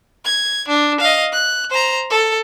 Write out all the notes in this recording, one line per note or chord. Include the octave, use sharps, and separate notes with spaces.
G#6
D4
D#5 F5
F#6
C5 A#5
A4